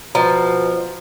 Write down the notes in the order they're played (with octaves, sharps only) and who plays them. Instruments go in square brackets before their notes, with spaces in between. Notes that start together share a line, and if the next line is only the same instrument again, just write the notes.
[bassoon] B2 [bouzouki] F3 [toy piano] A#5